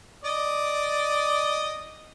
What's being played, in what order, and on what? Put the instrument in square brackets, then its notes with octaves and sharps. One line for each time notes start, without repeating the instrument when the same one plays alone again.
[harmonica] D5 D#5